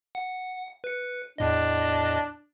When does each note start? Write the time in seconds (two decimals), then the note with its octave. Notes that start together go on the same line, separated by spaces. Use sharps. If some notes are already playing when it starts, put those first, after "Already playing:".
0.15 F#5
0.84 B4 C#7
1.38 E2 A2 D4 D#5